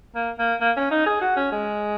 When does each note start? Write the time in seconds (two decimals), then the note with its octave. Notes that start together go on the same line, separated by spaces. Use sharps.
0.15 A#3
0.38 A#3
0.61 A#3
0.76 C#4
0.91 D#4
1.06 G#4
1.21 F#4
1.36 C#4
1.52 G#3